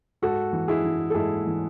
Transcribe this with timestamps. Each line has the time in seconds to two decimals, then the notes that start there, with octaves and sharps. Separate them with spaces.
0.22 G#2 F#4 A4
0.53 E3
0.68 E4 G#4
0.84 E3
1.10 A4
1.14 G#2 E4 G#4
1.47 E3